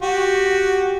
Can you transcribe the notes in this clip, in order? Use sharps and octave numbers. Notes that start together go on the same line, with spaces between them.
F#4 G4